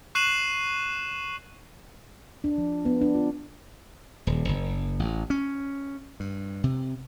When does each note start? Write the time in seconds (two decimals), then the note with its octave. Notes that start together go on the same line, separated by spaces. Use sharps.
0.15 C#6 F#6 C7 D#7 E7 F#7
2.44 D4
2.58 F3
2.85 B3
3.01 D4
3.14 F4
4.27 D#1
4.49 F#1
4.99 A1
5.30 C#4
6.20 G2
6.64 C3